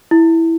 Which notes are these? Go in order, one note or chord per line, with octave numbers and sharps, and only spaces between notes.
E4